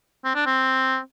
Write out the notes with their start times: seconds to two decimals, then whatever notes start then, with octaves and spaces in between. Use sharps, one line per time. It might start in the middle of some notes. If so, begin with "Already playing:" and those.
0.24 C4
0.35 D4
0.46 C4